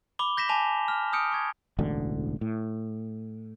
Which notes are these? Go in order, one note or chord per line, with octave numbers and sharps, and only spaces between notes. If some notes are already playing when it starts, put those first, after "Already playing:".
B5 D6 G7
G6 A#6 B6 E7
G#5 A5 D6 F7
F6
D#6 F6 G6 C#7 D7
C#6 F6 G#6
E1 A1 D2 D3
A2